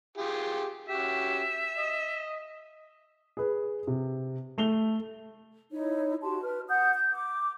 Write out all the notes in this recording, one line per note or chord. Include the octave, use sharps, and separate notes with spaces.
F4 G4 G#4
C#4 F#4 G4 E5
D#5
G#4 B4
C3
A3 F7 G7
D#4 E4 C#5
F#4 G4 A5 C6
B4 F6
F#5 D#6 G6
G6
D6